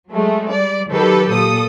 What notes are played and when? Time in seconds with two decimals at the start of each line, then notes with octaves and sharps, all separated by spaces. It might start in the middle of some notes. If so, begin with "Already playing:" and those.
0.11 F#3 G#3 A3
0.51 G3 D5
0.91 D#3 F#3 G4 A4 B4
1.30 A#2 A4 D#6